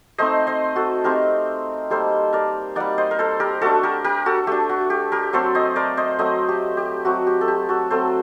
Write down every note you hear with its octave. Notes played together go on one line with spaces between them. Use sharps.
A3 C4 D#4 C5 D#5
C5 D#5
F#4 A4
A3 C4 D#4 G4 A#4
G3 A#3 D#4 A4 C5
A#4 D5
G3 A#3 D#4 D5 F#5
C5 D#5
A#4
A4 C5
G4 A#4
A3 D4 F#4 A4
G4 A#4
G4 A#4
F#4 A4
A3 D4 G4
F#4
G4
G4 A#4
F#3 A3 C4 A4 C5
C5 D#5
A#4 D5
C5 D#5
F#3 A3 C4 C5 D#5
G4
G4
F#3 A3 C4 F#4
G4
A4
G4
F#4 A4
F#3 A3 C4 A4 C5